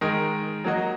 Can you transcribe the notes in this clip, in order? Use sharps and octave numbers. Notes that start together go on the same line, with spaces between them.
D#3 G#3 D#4 A#4
F#3 A#3 F#4 D#5